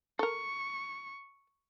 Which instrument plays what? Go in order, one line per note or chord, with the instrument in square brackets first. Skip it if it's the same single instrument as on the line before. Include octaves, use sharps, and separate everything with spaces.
[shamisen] A4 A#4 [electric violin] C#6